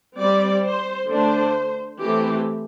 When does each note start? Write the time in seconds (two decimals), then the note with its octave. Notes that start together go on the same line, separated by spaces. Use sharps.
0.20 G3 C4 D5
0.66 C5
1.11 D3 A3 D4 C5
2.02 E3 A3 C4 G4